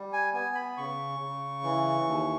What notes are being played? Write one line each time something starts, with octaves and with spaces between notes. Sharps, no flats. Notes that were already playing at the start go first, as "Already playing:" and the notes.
Already playing: G3
G#5
B3 G#5
B5
C#3 C#6
C#3
E3
D#2